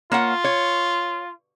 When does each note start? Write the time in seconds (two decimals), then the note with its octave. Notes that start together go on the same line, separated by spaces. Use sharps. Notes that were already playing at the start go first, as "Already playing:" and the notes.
0.12 A#3 F4 C#5 F#5
0.44 C#5